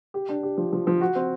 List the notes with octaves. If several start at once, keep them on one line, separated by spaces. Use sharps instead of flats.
G4
D4
G4
F3
F3
F3
F#4
C4